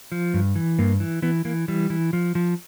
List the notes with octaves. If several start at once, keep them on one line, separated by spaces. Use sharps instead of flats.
F3
G2
E3
G2 A#3
E3
E3 B3
E3 A#3
E3 G3
E3
F3
F3